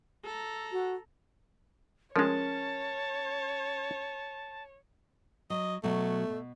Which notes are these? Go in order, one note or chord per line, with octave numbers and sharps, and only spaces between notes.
A4 A#5
F#4
F3 G#3 C#4 A#4 C#5 A5
F#3 D#5
B2 F#3 A3
B2